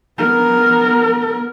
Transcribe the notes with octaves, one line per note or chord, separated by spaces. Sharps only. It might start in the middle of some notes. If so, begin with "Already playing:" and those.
B3 A#4